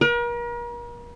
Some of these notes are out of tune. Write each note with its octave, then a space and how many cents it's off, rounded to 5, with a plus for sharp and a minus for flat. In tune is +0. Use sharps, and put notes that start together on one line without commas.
A#4 +40